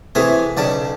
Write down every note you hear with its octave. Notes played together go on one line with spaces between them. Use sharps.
C3 E3 A3 G#4 G#5 D#6
B1 C#3 D5 A5